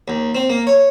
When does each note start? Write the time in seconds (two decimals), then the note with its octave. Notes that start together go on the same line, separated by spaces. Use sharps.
0.08 D#2
0.35 C4
0.50 A#3
0.67 C#5